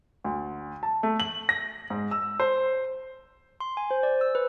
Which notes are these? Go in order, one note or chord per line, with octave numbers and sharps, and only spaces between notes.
D2
A5
A3
F#7
A#6
G#2
E6
C5
C6
G#5
C5
D5
E6
B4